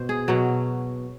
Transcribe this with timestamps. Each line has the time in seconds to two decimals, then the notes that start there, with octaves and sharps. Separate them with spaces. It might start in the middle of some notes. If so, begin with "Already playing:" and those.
Already playing: B2 C5
0.09 G#4
0.28 B2 F#3